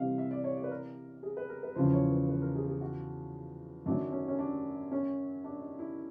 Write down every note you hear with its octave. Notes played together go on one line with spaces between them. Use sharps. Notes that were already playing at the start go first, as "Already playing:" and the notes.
Already playing: C3 E3 G3 C4 D#5 F5
E5
D5
C#5
D5
B4
A#4
G#4
B4
A#4
B4
E2 C#3 F3 C5
C#5
B4
B4
A#4
G#4
G#4
F#4
F#2 D#3 F#3 D4
C#4
C#4
D4
C#4
D4
D#4
E4